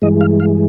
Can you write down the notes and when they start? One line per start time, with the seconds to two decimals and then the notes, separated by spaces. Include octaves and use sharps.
0.02 G2 E3 G#3 D#5
0.21 F5
0.40 F5